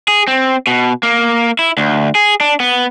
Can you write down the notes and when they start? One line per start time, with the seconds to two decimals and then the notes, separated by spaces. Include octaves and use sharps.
0.08 G#4
0.28 C4
0.67 B2
1.03 A#3
1.59 E4
1.77 D2
2.15 G#4
2.41 D4
2.60 B3